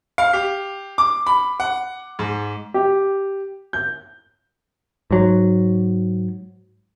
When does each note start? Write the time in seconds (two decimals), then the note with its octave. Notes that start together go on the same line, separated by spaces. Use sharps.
0.18 F5
0.33 G4
0.98 D6
1.27 B5
1.60 F#5
2.19 G#2
2.74 G4
3.73 G6
5.11 G#2 F#3